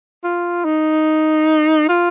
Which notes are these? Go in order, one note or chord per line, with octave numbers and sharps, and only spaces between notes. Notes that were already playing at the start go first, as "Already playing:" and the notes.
F4
D#4
F4